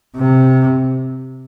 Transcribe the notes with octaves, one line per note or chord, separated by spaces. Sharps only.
C3